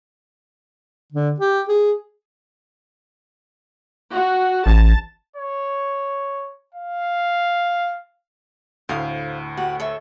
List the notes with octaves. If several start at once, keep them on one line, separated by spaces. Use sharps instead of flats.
D3
G4
G#4
F#4
A1 A5
C#5
F5
D2 A2 C5 F5 D#6
F#4 G4 F#5
A4 C#5 E5